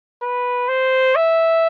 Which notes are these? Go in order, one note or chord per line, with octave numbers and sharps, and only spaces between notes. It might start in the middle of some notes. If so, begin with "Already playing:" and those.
B4
C5
E5